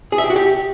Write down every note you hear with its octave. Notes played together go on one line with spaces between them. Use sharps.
G#4
E5
G4
F#4
G4